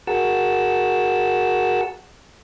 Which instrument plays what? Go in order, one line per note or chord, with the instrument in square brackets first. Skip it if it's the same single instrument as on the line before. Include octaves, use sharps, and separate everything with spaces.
[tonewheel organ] F#4 G#4 A#4 F#5 A5 E6